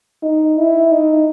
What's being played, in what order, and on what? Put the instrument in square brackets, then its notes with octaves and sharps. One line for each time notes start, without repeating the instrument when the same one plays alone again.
[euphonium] D#4
E4
D#4